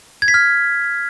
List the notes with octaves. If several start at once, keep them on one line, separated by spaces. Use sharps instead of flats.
G#6
B6
F6